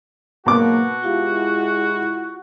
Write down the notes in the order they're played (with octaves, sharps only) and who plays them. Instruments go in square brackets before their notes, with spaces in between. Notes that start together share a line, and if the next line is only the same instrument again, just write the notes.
[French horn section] G#2 F#3 A#3 [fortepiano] B2 D6 [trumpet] F#4
[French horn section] G#3 E4 [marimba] F4 G4 F5